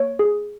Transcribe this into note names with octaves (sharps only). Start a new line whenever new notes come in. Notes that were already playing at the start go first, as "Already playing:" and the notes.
Already playing: A#3 C#5
G#4